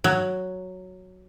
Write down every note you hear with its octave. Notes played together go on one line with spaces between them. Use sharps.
F#3